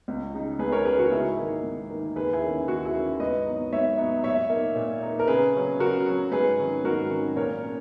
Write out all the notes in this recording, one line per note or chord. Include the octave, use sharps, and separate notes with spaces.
C#2
C#3 G#3 D#4
C#2 G#4 B4
A#4 C#5
C#3 G#3 D#4 G#4 B4
F#4 A#4
G#2 E4 G#4
D#3 A#3 D#4
G#2
D#3 A#3 D#4
D#2 G#4 B4
E4 G#4
D#3 A#3 C#4
D#2 F#4
E4 G#4
D#3 A#3 C#4
G#2 B4 D#5
F#3 B3 D#4
G#2 C#5 E5
F#3 B3 D#4
A#2 C#5 E5
A#3 D#4
A#2
A#3 D#4
A#4
C#3 G#4 B4
F#3 C#4
C#3 F#4 A#4
F#3 C#4
G#2 G#4 B4
D#3 F#3 C#4
G#2 F#4 A#4
D#3 F#3 C#4
A#2 A#4 C#5
A#3 C#4